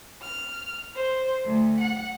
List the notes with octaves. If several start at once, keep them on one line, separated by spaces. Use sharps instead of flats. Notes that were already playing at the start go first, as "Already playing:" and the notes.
F6
C5
D2
F#5